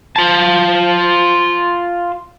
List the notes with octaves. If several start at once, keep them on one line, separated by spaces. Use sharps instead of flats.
F4 A5